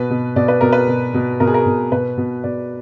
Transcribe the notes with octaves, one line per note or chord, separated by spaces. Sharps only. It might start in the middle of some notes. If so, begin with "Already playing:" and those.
Already playing: B2 B4
B2
B2 D5
B4
B2 A#4
B4
B2
B2
B2 A#4
G#4
A#4
B2
B2 B4
B2
B2 D5